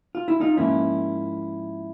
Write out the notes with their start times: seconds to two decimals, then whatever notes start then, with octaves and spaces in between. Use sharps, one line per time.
0.15 F4
0.28 E4
0.40 D#4 F4
0.57 G#2 F3 A#3 C#4 E4